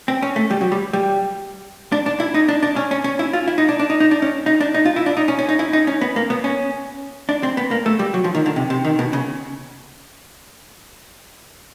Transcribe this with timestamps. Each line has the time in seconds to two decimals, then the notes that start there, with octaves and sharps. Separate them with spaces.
0.08 C4
0.22 C#4
0.36 A3
0.51 G3
0.61 F#3
0.72 G3
0.93 G3
1.92 D4
2.06 D4
2.20 E4
2.35 D#4
2.48 D4
2.63 D4
2.76 C#4
2.91 C#4
3.04 C#4
3.19 E4
3.33 F4
3.48 E4
3.58 D#4
3.69 D4
3.80 D4
3.90 D#4
4.00 D#4
4.11 D4
4.22 C#4
4.46 D#4
4.61 D4
4.74 D#4
4.86 F4
4.96 E4
5.06 D4
5.17 D#4
5.28 C#4
5.39 C#4
5.49 D#4
5.59 E4
5.73 D#4
5.87 C#4
6.01 B3
6.16 A#3
6.30 B3
6.44 C#4
7.29 D4
7.43 C4
7.57 B3
7.71 A#3
7.86 A3
7.99 G3
8.14 F#3
8.24 F3
8.35 D#3
8.46 D3
8.56 C3
8.70 C3
8.85 D#3
8.99 B2
9.13 C#3